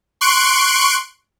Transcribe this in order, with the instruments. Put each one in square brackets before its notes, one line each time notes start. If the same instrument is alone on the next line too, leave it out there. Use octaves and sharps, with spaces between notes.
[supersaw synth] C6 C#6 F#6 D7